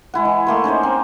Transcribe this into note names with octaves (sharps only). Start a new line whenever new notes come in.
G#3 E4 F#5
E3
A3 A#3 C6
C#4 D#4 G#4 C5
C4